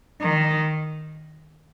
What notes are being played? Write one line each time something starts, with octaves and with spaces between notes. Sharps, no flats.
D#3